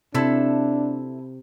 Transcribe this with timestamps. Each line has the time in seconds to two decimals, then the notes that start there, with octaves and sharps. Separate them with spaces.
0.14 C3 D4 E4 A4